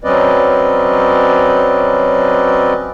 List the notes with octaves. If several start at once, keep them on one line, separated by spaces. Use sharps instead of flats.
F#3 C4 C#4 B4 D5 D#5